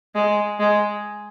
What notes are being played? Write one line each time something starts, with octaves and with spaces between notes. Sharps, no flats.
G#3
G#3